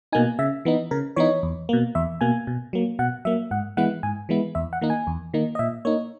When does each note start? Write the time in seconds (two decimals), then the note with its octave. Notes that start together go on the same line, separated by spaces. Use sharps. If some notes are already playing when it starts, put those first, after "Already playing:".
0.12 B2 A#3 D#4 G#5
0.39 C#3 E5
0.65 E3 B3 D#4
0.91 C#3 A#4
1.16 E3 B3 D#4 C#5
1.43 E2
1.69 B2 A#3
1.95 E2 E5
2.21 B2 A#3 G#5
2.47 B2
2.73 F#3 A#3
2.99 B2 F#5
3.25 F#3 A#3 E5
3.51 G#2 F#5
3.77 E3 G#3 B3 E4 F#5
4.03 G#2 G#5
4.29 E3 G#3 B3 E4
4.55 E2 E5
4.73 F#5
4.81 D#3 A#3 D#4
4.90 G#5
5.07 E2
5.34 D#3 A#3 D#4
5.55 D#5
5.59 A#2 E5
5.85 A#3 D#4 C#5